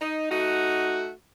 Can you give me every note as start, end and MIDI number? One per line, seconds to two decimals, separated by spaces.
0.01 0.31 63
0.31 1.11 57
0.31 1.11 63
0.31 1.11 66